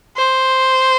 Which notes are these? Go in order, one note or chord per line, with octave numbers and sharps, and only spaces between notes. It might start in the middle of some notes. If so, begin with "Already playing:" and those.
C5